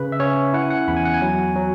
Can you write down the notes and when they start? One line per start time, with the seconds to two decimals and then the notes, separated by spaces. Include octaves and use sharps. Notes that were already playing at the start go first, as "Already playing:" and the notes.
Already playing: C#3 B4
0.12 E5
0.20 C#4 C#5
0.53 E4 F#5
0.62 G#5
0.70 F#5
0.88 E2 B5
0.97 G#5
1.05 F#5
1.14 G#5
1.22 F#3
1.56 F#3